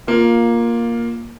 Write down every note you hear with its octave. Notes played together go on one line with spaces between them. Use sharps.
A#3 F4